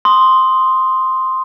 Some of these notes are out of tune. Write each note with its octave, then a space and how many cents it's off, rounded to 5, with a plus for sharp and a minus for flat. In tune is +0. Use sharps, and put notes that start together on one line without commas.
C6 +0 D#6 +0